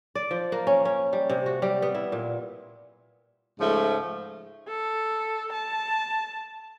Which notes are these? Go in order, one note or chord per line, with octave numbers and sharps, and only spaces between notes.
D5
F3
A#3
C#4
C#4
G3
C3
F#4
G3
B3
E4
A#2
G#2 C#3 F3 A3
A4
A5